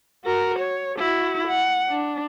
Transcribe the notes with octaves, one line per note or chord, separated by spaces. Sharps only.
F#4 A#4
C#5
E4 F#4
F#5
D4